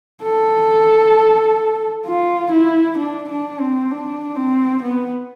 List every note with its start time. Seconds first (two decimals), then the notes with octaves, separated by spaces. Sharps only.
0.23 A4
2.06 F4
2.52 E4
2.98 D4
3.29 D4
3.60 C4
3.91 D4
4.36 C4
4.82 B3